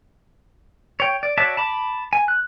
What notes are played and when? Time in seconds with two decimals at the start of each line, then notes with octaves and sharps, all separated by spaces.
1.00 C#5 G5
1.23 D5
1.37 F#4 C#5 D5 E5 A5
1.57 A5 B5 D6
2.13 G#5
2.28 F#6